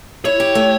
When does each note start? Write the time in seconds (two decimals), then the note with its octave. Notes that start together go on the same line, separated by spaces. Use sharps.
0.25 E4 C#5
0.40 G4
0.55 A3